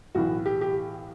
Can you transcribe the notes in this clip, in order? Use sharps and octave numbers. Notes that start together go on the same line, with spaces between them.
B1 A2 E3 F#4
G4
G4